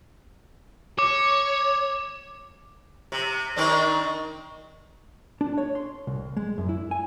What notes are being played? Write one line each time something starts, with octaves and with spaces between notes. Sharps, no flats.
C#5 D6
C3
D#3 C4 D4
D4
C#5
C6
C2
G#3
F#2
E4
G#5